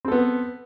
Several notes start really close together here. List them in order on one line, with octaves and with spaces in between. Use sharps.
C4 A4 B3